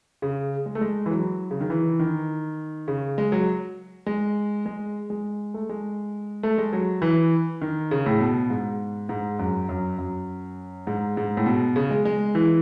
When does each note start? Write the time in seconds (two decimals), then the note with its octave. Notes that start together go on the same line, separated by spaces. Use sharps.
0.22 C#3
0.66 G#3
0.75 A3
0.81 G#3
1.06 E3
1.11 F#3
1.51 C#3
1.60 D#3
1.70 E3
2.00 D#3
2.88 C#3
3.18 G#3
3.32 F#3
4.06 G#3
4.66 G#3
5.10 G#3
5.54 A3
5.69 G#3
6.43 A3
6.58 G#3
6.73 F#3
7.02 E3
7.61 D#3
7.91 C#3
8.06 A2
8.20 B2
8.50 G#2
9.09 G#2
9.39 F#2
9.69 F#2
9.98 F#2
10.87 G#2
11.17 G#2
11.37 A2
11.46 B2
11.76 C#3
11.91 G#3
12.05 G#3
12.35 E3